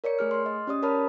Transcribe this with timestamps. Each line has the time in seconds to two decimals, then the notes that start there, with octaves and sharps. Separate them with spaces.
0.04 A#4 C#5 D5 C#7
0.19 A3 G#4 F6
0.31 C6 F6
0.46 D#5
0.67 C#4 G4 D5 D#6
0.83 A#4 C#5 A5 B5 F6